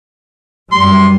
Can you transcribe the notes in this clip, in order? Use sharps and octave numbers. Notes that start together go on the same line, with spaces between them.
F#2 G3 C6